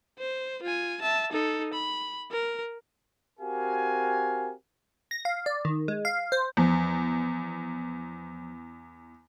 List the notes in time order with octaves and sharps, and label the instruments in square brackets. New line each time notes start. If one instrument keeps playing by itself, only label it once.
[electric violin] C5
F4 G#5
E5 A5
D#4 A4
B5
A#4
[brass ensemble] C4 F#4 G4 A#4 F5 G#5
[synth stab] A#6
F5
D5
D#3
G#3
F5
C5
[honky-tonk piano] E2 [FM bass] F3